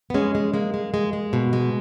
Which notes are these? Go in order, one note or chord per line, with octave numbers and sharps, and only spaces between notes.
B3
G#3 C#4
G#3
G#3 A#3
G#3
G#3
G#3
B2
G#3